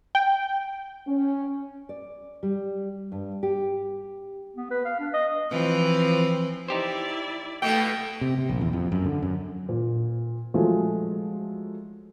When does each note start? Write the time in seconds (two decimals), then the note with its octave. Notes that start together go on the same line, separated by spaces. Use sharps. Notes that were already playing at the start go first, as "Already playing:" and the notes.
0.15 G5
1.07 C#4
1.89 D5
2.43 G3
3.12 G2
3.43 G4
4.56 B3
4.71 B4
4.85 F5
4.99 D4
5.13 D#5
5.51 E3 F3 C4
6.68 D#4 E4 G4 C5 D5
7.62 B2 A3 B3 G5
8.21 C3
8.38 C3
8.49 A#1
8.61 E2
8.73 F2
8.92 F#2
9.05 D3
9.23 F#2
9.69 A#2
10.54 F3 F#3 G#3 A3 F4